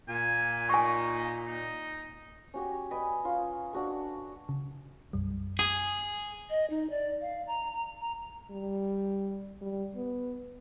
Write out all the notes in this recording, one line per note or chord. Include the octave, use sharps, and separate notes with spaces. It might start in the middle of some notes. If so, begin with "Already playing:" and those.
A#2 G#5
D#4 G#5 C#6
D#4
C#4 F#4 G4
B4 D5 D#5 G#5
C#4 F4
D4 F#4 A4
C#3
B1 F#2 G3
G#4 G#5 D#6
D#5
D#4
D5
F5
A#5
A#5
A#5
G3
G3
B3